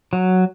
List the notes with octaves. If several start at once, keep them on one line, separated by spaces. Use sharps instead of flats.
F#3